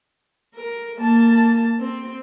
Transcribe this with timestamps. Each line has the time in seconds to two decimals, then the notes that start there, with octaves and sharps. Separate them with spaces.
0.55 A#4
0.98 A#3 A5
1.80 C4